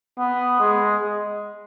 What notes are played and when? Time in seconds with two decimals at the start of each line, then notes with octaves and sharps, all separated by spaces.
0.18 B3
0.60 G#3